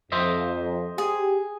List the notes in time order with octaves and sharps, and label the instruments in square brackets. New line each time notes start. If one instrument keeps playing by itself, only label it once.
[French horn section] F2 [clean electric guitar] C5 D#5 E5
[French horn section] G4 [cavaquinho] G#4